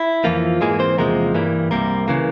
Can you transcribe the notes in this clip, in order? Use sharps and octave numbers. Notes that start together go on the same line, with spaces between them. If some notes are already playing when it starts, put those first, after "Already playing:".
Already playing: E4
F2 E3 F3 A#3 F4
G#2 E3 G#3 A#3 G#4
C4 C5
E2 C3 F3 G#3 A#3 A#4
G2 E3 G3 A#3
C2 C3 G3 A#3 A#4
C#3 E3 A#3